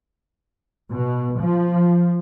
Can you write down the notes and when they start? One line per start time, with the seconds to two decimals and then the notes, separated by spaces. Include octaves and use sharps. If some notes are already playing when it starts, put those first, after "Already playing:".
0.91 B2
1.40 F3